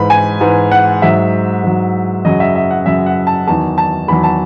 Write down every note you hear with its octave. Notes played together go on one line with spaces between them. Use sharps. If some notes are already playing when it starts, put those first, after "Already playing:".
Already playing: G#2 E3 B5
G#5
G#2 E3
F#5
G#2 F#3 E5
G#2 F#3
F#2 C#3 F#3 D#5
E5
E5
F#5
F#2 C#3 F#3 E5
F#5
A5
E2 D#3 F#3 A5
A5
E2 D#3 F#3 B5
A5